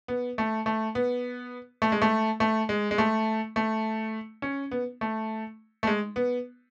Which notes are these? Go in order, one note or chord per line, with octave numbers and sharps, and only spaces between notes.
B3
A3
A3
B3
A3
G#3
A3
A3
G#3
G#3
A3
A3
C#4
B3
A3
A3
G#3
B3